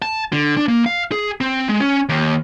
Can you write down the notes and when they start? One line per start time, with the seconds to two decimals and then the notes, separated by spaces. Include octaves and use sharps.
0.02 A5
0.33 D3
0.57 D4
0.68 A#3
0.86 F5
1.12 G#4
1.41 C4
1.69 G#3
1.80 C#4
2.09 D#2